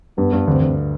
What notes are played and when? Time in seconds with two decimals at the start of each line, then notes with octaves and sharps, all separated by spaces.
0.18 G2 B3
0.33 G2
0.48 D2 C4
0.62 D2